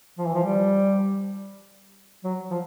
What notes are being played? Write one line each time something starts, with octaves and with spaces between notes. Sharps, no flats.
F3
E3
F3
G3
F#3
F3